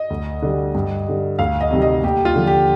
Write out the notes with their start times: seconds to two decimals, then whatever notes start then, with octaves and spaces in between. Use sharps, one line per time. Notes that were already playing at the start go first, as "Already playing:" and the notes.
Already playing: D#5
0.10 D2
0.42 D3 G3
0.75 G2
1.07 D3 G3
1.39 D2 F5
1.61 D#5
1.71 C3 D#3 G3
1.82 D#5
2.03 D#2 G4
2.25 F4
2.36 D3 F3
2.47 G4